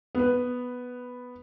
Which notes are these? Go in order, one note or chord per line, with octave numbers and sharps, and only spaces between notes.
B3 B4